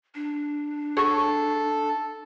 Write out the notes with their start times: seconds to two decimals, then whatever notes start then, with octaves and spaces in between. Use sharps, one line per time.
0.15 D4
0.97 F#4 G#4 A4 C#5